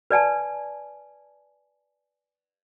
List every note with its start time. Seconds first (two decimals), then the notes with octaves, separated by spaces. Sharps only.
0.11 B4 D5 G#5 A5